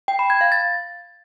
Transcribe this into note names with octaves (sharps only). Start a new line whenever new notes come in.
G5
B5
G#6
F5
A6